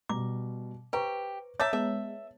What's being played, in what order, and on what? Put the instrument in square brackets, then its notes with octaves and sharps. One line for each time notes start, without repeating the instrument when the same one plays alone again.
[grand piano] B2 G3 A#5 [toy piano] D6
[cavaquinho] G4 [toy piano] B4 [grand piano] C5 A#5 C#6
[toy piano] C#5 [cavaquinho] E5 A5 D6 [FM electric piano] A#5 [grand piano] A6
[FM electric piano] G#3 B3 [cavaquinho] E5